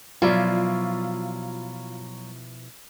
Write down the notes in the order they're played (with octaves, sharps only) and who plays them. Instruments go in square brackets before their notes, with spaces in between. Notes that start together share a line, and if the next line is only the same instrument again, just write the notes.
[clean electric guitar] B2 F3 E4 [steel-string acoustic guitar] F#3 [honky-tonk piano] F4 D5